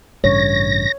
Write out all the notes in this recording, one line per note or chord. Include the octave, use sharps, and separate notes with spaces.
A1 G2 C#3 C#5 A#6